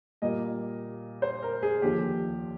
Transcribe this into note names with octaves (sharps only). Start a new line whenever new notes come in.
A#2 G3 A#3 D#5
C5
A#4
G#4
D#2 D3 F3 G4